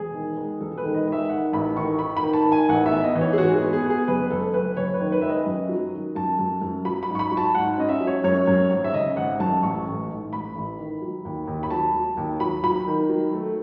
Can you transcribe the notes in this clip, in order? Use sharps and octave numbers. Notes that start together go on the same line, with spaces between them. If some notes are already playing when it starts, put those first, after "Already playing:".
Already playing: E1 G#4
D#3
G#3
E1 A4
A4
B4
D#3
D#5
G#3
E5
D#3 F#5
A1 B5
D#3 C#6
D#3 B5
B5
D#3
A5
D#3
G#5
A1 F#5
E5
B3
D#5
E3
C#5
G#4
G#2 F#4
G#4
B3
G#4
B3
G#4
F#1 B4
F#1 A4
F#1 B4
F#1 C#5
B4
D#3
B4
G#3 E5
D#5
F#2
F#3
D#3
F#2 A5
F#2
F#2
F#3 B5
B5
G#2
C#6
B5
F#3
A5
G#2 F#5
C#4 D#5
E5
F#3
C#5
F#2 C#5
F#2
G#1
E5
C#3 D#5
G#1 F#5
F#2 A5
A1 C#6
A1
G#2
A1 B5
A1
D#3
F#3
D#2
D#2
B5
F#3 A5
F#3
D#2
F#3 B5
F#3 B5
D#3
F#3
A3